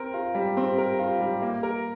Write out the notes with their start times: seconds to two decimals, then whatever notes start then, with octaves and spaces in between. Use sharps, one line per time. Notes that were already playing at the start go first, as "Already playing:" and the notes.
Already playing: C4 A#4
0.14 F4
0.35 G3
0.57 C4
0.78 A#4
0.99 F4
1.21 G3
1.42 A#3
1.63 A#4